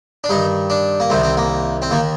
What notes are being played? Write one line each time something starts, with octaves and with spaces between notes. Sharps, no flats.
D4
G2 D#3 D#4
D4
A#3
C2 C3 D#3 C4
C4
A#3
C4
D#2 D#3 A#3